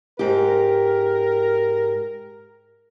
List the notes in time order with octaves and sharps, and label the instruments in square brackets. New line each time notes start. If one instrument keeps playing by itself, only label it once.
[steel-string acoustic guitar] G#2 G4 [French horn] A#4